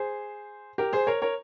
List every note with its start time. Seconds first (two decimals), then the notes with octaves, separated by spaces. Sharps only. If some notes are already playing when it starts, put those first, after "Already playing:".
Already playing: G#4 C5
0.78 G4 A#4
0.93 G#4 C5
1.07 A#4 C#5
1.22 A#4 C#5